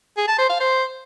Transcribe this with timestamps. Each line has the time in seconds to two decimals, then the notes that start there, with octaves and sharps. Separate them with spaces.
0.17 G#4
0.28 A5
0.39 C5
0.49 F5
0.60 C5